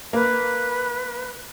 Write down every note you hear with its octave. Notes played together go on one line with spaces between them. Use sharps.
A#3 B4